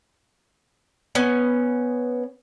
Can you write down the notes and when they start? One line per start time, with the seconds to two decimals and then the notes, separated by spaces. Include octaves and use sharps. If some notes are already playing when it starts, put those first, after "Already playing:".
1.15 B3 C#4